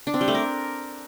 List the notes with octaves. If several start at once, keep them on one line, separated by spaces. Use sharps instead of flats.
D4
C4
G3
A3
A#4